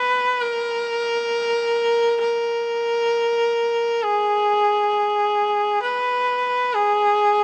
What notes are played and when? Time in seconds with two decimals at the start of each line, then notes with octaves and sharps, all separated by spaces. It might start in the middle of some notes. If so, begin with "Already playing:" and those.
Already playing: B4
0.41 A#4
2.21 A#4
4.03 G#4
5.82 B4
6.74 G#4